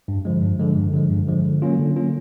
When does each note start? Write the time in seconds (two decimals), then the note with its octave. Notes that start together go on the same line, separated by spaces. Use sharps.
0.08 G2
0.25 D3 F3 G#3
0.42 G2
0.59 D3 F3 G#3
0.77 G2
0.94 D3 F3 G#3
1.11 G2
1.28 D3 F3 G#3
1.45 D3
1.62 F#3 A#3 C#4 F4
1.79 D3
1.96 F#3 A#3 C#4 F4